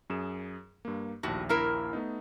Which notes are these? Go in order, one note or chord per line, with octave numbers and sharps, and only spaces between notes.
F#2 G#4 E7
G2 A#3
A#1 D#2 A2 F#4
A#3 E4 A#4
A3 B3 D#4